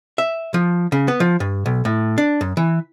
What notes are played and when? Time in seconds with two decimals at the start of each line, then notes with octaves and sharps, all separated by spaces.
0.18 E5
0.54 F3
0.92 C#3
1.08 B3
1.20 F3
1.40 G2
1.66 B1
1.85 A2
2.18 D4
2.41 F#2
2.57 E3